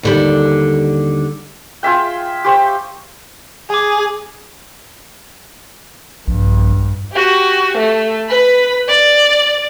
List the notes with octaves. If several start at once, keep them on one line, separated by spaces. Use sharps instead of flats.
D#2 D3 G3
F4 G#4 E5 G5
G4 C5 C#6
G#4 G#5 D6
A#1 G2
F#4 G4
A3
B4 B5
D5